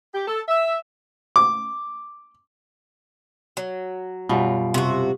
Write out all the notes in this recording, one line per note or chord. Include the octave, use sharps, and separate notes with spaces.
G4
A4
E5
D6
F#3
F#2 B2 G3 F4
C3 F#4